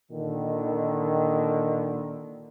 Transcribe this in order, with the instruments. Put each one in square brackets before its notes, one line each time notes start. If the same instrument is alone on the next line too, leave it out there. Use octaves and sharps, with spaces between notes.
[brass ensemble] A#2 D3 D#3